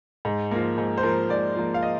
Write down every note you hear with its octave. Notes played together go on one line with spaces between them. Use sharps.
G#2
F3 A#3
G#2
C5
F3 A#3 A#4
G#2 D5
F3 A#3
F5
D#5